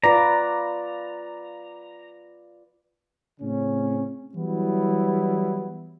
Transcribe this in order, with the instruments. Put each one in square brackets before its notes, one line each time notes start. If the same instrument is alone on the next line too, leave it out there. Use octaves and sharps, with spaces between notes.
[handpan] F4 B4 D5 [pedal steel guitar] A#5
[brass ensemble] A2 C#3 C4 C#4
E3 F#3 G3 B3 E4